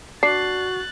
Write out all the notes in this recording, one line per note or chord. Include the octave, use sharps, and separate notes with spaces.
D4 F#4 F#6 A6 C7